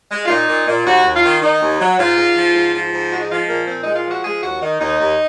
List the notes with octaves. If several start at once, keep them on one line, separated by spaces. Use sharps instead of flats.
G#3
F4
A#2 D#4
A#2
A#2
D#2 F#4
D#2
F4
D#3
D#3 D#4
D#2
F#3
G#2 F4
G#2
F3
G#2
F3
G#2
G#3 F#4
D#4
F3 F4
A#2 A#3
A#2 C4
G#3 D#4
F4
F3
F#4
G#3 G#4
D#2 F#4
D#3 D#4
D#2 D#4
D#2